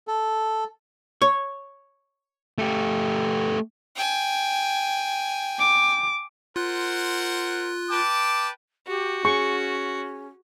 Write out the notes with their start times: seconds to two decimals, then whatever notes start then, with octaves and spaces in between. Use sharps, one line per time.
0.08 A4
1.22 C#5
2.58 A3 G4
3.96 G5 G#5
5.60 D6
6.56 F4 A#4 C5 F#5 F#6
7.91 B4 G5 A5 D6
8.87 F#4 G4
9.25 C#4 G#4 C#6